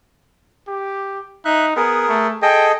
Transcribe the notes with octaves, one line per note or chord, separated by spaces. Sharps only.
G4
D#4 E5 F#6
B3 G#4 A#4
A3
G#4 A4 D#5 G5